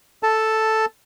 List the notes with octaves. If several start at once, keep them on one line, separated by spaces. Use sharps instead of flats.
A4 A5